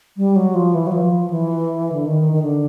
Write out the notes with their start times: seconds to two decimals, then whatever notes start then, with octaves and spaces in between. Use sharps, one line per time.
0.17 G3
0.36 F#3
0.55 F3
0.74 E3
0.87 F#3
0.92 F3
1.30 E3
1.92 D3
2.06 D#3
2.33 D#3
2.43 D3